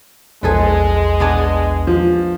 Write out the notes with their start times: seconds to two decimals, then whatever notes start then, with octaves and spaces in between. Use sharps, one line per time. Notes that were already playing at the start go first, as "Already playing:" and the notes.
0.43 A#1 E2 G#3 G#4 A4 B4
1.20 B3 D4 G#4
1.87 F3